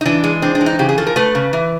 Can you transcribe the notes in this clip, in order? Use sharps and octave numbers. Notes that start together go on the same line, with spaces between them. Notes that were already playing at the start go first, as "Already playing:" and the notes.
D#4
E3 D4
G#3
C4 D4
D4
E3
D#4
C#3 G4
G#4
F3 A4
A#4
A3 B4
C#3
E3